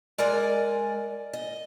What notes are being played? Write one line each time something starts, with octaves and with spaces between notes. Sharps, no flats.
G#3 A#4 D5 G#5
D#5